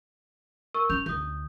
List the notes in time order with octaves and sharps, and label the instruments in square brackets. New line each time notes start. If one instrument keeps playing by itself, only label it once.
[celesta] A#4 C#6 E6
[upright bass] C#4 [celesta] G6 F7
[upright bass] D2 [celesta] D#6 G6